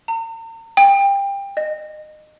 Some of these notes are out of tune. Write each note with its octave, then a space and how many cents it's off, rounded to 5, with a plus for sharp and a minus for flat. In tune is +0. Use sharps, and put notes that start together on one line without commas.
A#5 -45
G5 +25
D#5 -25